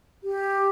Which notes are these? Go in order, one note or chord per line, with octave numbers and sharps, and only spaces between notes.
G4